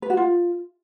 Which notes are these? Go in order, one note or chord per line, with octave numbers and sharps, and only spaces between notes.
B4
F#4
F4